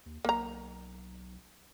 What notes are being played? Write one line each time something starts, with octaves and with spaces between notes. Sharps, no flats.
D#2
B1 A#3 A#5